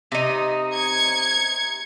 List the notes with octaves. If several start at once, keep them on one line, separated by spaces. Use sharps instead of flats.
C3 D#4
G#6 C#7